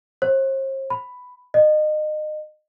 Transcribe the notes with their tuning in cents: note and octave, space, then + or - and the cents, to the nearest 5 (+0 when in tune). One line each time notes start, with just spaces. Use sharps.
C5 +40
B5 +10
D#5 -30